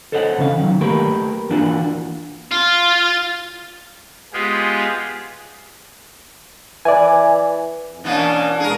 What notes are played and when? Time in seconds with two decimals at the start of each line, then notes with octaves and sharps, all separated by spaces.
0.12 A4 C5 C#5 D#5 E5 F#5
0.38 C#3 E3 C#4 F5
0.59 D#3 F#3
0.81 A3 A#3 G4 A#4 B4
1.50 E3 A#3 D4 F4 F#4
2.51 F4
4.33 G#3 B3 F4 G4 G#4
6.85 E3 D5 G#5
7.89 F2
8.04 B2 E3 A#3 C#4 D4
8.60 B2 G#3 G#4 A#4